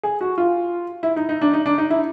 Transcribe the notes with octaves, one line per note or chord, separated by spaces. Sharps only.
G#4
F#4
F4
E4
D#4
D#4
D4
D#4
D4
D#4
E4